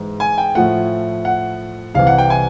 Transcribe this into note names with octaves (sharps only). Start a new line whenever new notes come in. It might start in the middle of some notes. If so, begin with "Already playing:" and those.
Already playing: G#2 E3 G#3
G#5
G5
A2 F3 A3 F#5
F#5
C2 C3 E3 F5
F#5
G5
G#5